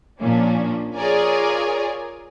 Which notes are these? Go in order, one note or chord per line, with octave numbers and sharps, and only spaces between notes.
A#2 F3 C#4 D4
F4 G#4 A#4 C#5 D5 G#5